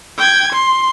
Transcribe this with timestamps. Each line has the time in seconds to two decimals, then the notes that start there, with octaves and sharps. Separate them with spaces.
0.18 G5 G#6
0.52 C6